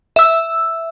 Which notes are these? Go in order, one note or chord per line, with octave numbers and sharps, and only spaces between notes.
E5 E6